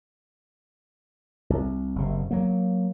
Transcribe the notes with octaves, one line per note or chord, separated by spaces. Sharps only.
C2
F#1 C3
F#3 A#3